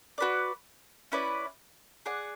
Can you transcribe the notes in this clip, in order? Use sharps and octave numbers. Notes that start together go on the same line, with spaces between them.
F#4 B4 D5
C#4 E4 B4 D5
G#4 D5 F#5